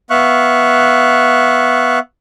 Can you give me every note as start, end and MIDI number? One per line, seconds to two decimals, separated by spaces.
0.10 1.99 59
0.10 1.99 76
0.10 1.99 77
0.10 1.99 85
0.10 1.99 90